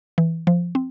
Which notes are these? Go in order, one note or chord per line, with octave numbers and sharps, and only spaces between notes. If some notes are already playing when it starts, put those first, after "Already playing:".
E3
F3
C4